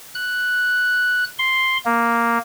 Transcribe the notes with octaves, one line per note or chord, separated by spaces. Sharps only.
F#6
C6
A#3